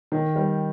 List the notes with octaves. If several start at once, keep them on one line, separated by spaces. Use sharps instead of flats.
D#3
G3